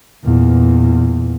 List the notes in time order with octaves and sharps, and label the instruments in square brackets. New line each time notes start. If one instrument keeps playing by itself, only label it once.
[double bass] E2 A#2